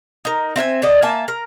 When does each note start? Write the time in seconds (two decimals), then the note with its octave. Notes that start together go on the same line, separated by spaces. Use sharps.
0.25 D#4 A#4
0.56 C4 E5 F5 G#5
0.82 D3 A4 D5 D#5
1.02 A#3 E5 G#5 A5
1.28 A#4